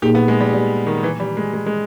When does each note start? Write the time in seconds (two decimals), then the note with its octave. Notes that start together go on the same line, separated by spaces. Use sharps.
0.02 A#2 A#3 D#4 G4 G#4
0.15 B3
0.28 G#3
0.40 G3
0.53 G3
0.86 D#3
1.03 E3
1.20 G3
1.37 G#3
1.53 G#3
1.66 G#3